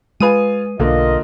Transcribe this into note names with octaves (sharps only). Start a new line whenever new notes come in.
G#3 F4 B4 F5 G#5 D#6 D#7
B1 D3 A#3 F4 A#4 D#5